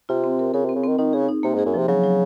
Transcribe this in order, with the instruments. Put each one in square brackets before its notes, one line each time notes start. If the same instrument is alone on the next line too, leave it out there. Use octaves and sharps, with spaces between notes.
[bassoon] C3 [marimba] F4
[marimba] C4
A#4
[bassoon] C#3 [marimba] A#4
[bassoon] C3 [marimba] C4
[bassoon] C#3
[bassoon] D#3 [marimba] C4
[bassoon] D#3 [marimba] D#4
[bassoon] C#3 [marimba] G#4
[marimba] D#4
[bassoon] C3 [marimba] A#3
[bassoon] G#2 [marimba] G#4
[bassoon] F#2
[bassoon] C3 [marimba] F3
[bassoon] C#3 [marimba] F#3
[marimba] F#3